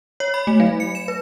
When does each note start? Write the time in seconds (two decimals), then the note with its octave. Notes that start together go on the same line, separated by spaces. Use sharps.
0.20 C#5
0.34 B5
0.47 A3
0.60 F#3
0.80 C#7
0.95 E7
1.08 B4